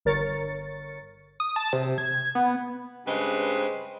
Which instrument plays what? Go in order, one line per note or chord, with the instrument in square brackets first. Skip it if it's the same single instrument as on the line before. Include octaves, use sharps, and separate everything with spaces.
[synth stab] G1 D3 A#4 C#5 A6 C#7
[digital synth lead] D#6
A5
C3
G#6
B3
[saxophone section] G2 C#3 G#3 C4 B4 C5